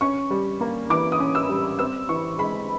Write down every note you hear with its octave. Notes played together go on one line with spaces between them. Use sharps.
C#4 C#6
G3
A#3
E3 D6
D#6
C#4
E6
G3
C4 E6
E3 C#6
G#3 B5